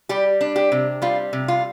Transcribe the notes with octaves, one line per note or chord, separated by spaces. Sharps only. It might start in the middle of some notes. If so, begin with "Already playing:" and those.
G3 G4
D4
G4
C3
G3 F4
C3
F4